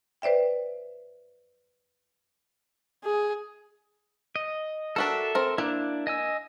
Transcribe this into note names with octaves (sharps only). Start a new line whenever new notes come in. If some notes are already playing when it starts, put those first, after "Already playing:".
B4 C5 D5 E5 G5
G#4
D#5
D4 F#4 A4 A#4 E5
C4 A#4
A#3 D4 E4
D#5 G#5 E6